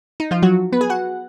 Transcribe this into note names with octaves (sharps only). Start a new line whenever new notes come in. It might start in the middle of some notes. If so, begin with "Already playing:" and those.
D#4
F3 F4
F#3 F#4
B3 B4
G#4 G#5
F#4 F#5